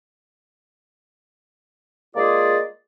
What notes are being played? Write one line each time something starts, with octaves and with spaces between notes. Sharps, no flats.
G#3 A#3 F4 G#4 D5